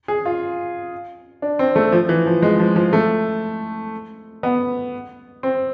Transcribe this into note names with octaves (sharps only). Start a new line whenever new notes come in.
G#4
F4
D4
C4
A3
F3
E3
F3
G#3
F3
F3
A3
B3
C4